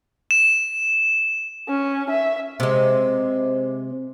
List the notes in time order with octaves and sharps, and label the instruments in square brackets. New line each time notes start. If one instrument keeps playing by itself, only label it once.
[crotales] E7
[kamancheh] C#4
E5
[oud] C3 G#3